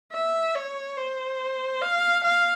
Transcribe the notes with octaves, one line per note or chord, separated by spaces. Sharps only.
E5
C#5
C5
F5
F5